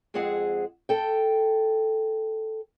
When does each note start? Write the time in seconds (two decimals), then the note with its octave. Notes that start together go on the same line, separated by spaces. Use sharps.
0.14 F2 G#3 C4 G#4 F#5
0.89 A4 G5